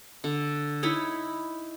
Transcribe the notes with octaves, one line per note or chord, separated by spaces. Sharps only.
D3
D#4 E4 C#5 B5